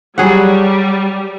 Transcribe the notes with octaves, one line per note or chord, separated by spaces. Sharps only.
F#3 G3 G#4 F#5